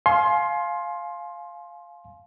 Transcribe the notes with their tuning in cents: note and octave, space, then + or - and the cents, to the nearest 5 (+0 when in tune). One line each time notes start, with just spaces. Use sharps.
F5 +0 G#5 +35 C6 +15